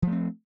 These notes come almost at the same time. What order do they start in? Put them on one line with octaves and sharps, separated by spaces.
F3 A3 C4